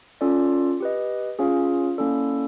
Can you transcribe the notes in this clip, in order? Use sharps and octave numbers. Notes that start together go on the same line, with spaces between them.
C#4 F4 A4 D5
G4 B4 D#5
C#4 F4 G#4 C#5 F5
A#3 C#4 E4 A4 D5